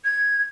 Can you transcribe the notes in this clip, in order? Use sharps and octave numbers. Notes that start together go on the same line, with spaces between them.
G#6